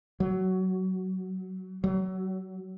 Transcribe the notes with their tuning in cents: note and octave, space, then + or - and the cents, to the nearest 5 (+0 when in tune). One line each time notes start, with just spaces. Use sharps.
F#3 +15
F#3 +30